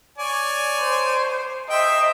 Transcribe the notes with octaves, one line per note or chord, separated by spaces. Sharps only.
C#5 D5 G#5
C5
C5 D#5 E5 G5